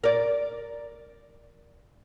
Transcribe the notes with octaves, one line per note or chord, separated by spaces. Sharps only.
A#4 D5